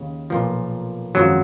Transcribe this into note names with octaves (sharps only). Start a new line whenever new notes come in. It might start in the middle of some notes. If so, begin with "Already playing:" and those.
Already playing: D#2 C#3
B1 A#2 F3
G#1 F#2 F3 F#3